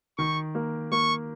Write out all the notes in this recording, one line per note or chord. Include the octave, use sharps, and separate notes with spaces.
D#3 C#6
A#3
A#3 C#6